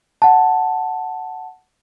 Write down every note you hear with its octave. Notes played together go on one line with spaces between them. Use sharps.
F#5 A5